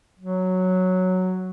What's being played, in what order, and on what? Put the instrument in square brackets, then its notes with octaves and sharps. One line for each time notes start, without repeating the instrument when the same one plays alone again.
[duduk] F#3